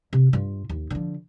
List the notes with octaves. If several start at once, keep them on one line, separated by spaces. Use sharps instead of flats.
C3
G2 F4
D#2
D3 F3